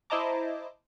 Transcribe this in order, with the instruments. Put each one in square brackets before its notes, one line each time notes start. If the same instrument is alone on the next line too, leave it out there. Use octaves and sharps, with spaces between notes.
[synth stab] E4 C5 D#5 A5 A#5 D6